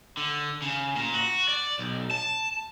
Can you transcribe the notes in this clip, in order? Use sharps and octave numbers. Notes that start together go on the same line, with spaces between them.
D3
C#3
A#2
F#4
D5
B1
A5